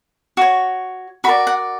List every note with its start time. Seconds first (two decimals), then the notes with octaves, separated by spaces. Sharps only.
0.37 F#4 C#5
1.24 F#4 A#4 D5 B5
1.47 F#5